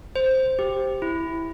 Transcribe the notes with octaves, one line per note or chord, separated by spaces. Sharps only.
C5
G4
E4